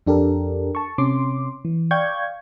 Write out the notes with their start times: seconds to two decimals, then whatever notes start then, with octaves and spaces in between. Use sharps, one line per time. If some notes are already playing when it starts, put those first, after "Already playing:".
0.07 F2 D4 G4 A4 A#4
0.75 A5 C#6
0.98 C3 C#4 C6 D6
1.65 E3
1.91 D5 F5 G5 C#6 G6 G#6